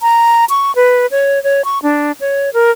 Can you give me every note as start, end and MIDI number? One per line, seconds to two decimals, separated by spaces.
0.01 0.45 82
0.49 0.72 85
0.76 1.06 71
1.11 1.42 73
1.44 1.64 73
1.65 1.79 85
1.83 2.12 62
2.21 2.50 73
2.54 2.71 70